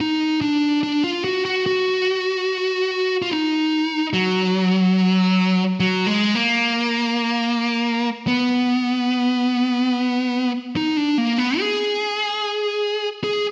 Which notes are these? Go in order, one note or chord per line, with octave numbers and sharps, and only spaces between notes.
D#4
D4
D4
F4
F#4
F#4
F#4
F4
D#4
F#3
F#3
G#3
A#3
B3
D#4
D4
A#3
B3
G#4
G#4